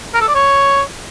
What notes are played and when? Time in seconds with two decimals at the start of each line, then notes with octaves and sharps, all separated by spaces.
0.14 A#4
0.21 A4
0.28 D5
0.35 C#5